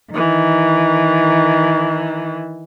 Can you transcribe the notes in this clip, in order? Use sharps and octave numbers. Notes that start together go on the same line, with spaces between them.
D#3 E3